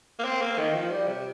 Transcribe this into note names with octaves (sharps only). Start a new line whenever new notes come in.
A#3
C4
A#3
D#3
F3
G3
C3